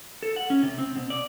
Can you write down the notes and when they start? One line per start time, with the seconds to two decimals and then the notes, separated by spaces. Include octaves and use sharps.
0.23 A4
0.36 F#5
0.50 C#4
0.63 C3
0.78 C4
0.96 B2
1.10 D5